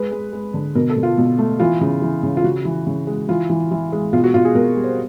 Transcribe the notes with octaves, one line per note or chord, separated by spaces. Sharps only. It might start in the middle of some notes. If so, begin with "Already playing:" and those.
Already playing: G#3 B4
G#3
G#3
D3
B2 A#4
A4
B2
F4
B2
A3
E3 F4
C#3
E3
C#3
F4
C#3 F#4
E3
C#3
G#3
E3 F4
E3
E3
G#3
B2 F4
F#4
B2 F4
G#4
B2 A#4
G3
C5